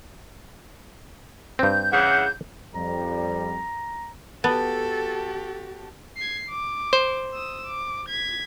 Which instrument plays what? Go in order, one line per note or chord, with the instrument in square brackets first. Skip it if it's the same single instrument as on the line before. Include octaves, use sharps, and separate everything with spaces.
[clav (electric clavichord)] G2 C4 [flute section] G6
[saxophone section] C#3 E3 [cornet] F#5
[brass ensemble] F2 G3 [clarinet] A#5
[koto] B3 [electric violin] F#4 G4 [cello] A4 [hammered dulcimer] A5
[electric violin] G#6 C7
D6
[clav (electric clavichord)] C5
[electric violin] D#6 E6
D6
G#6 B6